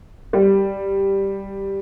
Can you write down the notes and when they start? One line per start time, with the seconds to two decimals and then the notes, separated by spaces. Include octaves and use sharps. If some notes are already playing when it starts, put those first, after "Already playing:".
0.33 G3